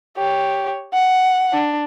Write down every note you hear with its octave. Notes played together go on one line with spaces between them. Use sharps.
G4 C#5
F#5
D4